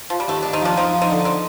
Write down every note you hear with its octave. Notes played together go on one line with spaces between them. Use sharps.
F3
G3
D#2 A3
D#2 D4
C4 D#4
F3 D4 F4
F3 C4 D#4
F3
C4 D#4
D3
C4 D#4